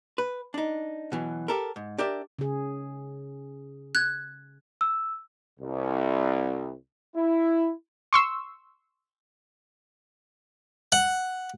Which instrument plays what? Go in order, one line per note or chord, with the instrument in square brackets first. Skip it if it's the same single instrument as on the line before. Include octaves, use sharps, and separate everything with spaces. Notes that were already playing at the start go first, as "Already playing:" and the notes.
[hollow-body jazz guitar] B4
D4 D#4
B2 E3 F#3
G4 A4 A#4
G#2
D4 G4 A#4 D5 E5
[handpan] C#3 G#4
[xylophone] F#6 G#6
[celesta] E6
[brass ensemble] C2
E4
[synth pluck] C6 C#6 E6
[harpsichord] F#5